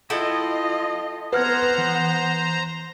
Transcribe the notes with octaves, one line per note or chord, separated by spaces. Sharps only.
E4 F4 A4 D#5 G5
B3 B4 C5 F#5 A#5 F6 G#6
E3